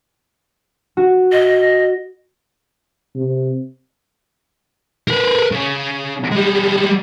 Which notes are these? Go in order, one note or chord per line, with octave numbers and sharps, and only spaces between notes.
F#4
D#5
C3
A#4 B4
C#3
G3 G#3